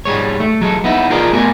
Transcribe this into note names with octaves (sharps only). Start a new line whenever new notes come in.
G#2 G3 G#3 C#5
A3
F#3 G#3 A4
B3 D#4 E4
F4 G#4 A#4 D5 D#5
A3 B3 F#4 A#4 D5 G#5